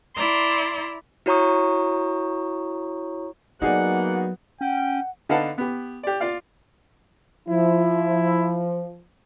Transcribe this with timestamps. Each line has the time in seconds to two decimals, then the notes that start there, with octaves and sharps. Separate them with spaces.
0.15 E4 D5 A#5 C6
1.26 E4 F#4 C#5 A#5 C#6 D#6
3.62 F#3 A#3 B3 D#4 F#4 G#4 D5 F#5
4.61 C#4 F#5 G5
5.29 D3 D#4 B4 F5 F#5 A5
5.58 B3 G4
6.03 G4 D5
6.20 F4 D5 F5
7.48 F3 E4